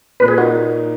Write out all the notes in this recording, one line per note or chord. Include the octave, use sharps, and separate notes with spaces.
A#2 B4
G#4
A#3 D#4 F#4